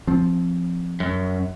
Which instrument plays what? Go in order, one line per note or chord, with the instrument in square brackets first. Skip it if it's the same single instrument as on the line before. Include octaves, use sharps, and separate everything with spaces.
[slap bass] F3 C4
[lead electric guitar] F#2